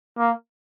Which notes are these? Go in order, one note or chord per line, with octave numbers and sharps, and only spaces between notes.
A#3